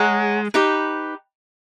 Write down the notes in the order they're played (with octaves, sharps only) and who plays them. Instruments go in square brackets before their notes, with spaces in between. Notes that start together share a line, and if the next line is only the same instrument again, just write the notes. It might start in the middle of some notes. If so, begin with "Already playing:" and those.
Already playing: [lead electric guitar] G#3 [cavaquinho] G#4 C#5 F#5 A#5
[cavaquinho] D#4 G4 B4